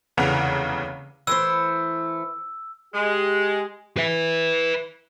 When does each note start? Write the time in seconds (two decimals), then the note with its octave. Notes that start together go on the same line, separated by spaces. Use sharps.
0.17 F1 E2 C#3 E3 F#5 F7
1.27 E3 A3 C5 E6
2.94 G#3 G4
3.97 B4 E5